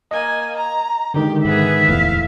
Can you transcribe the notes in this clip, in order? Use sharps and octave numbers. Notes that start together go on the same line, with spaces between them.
A#3 D#5 G#5
A#5
D3 D#3 G#3 G4
G#2 B3 G#4 E5
D1 E2 A2 F5